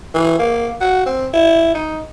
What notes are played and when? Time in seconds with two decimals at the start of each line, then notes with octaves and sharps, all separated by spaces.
0.15 E3
0.39 A#3
0.81 F#4
1.06 C4
1.34 E4
1.75 D#4